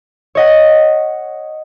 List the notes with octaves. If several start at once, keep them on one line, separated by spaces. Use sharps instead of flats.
C#5 D#5 F#5